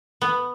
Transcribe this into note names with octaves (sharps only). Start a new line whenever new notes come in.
B3